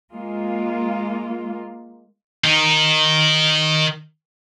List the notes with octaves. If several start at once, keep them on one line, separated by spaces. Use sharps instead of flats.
G#3 A#3 F4
D#3 D#4